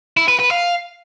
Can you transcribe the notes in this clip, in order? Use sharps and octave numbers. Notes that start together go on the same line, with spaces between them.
E4
B4
B4
F5